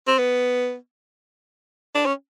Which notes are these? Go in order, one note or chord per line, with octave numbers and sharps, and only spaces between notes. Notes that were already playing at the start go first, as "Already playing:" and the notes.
C4
B3
D4
C#4